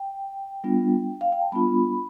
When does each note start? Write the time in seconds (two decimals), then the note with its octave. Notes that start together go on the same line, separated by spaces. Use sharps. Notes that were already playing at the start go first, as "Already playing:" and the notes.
Already playing: G5
0.64 G3 B3 D4 F4
1.21 F5
1.32 G5
1.42 A5
1.52 G3 B3 D4 F4 B5